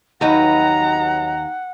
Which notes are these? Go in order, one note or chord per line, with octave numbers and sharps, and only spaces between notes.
D#2 F#3 D#4 B4 F#5 A#5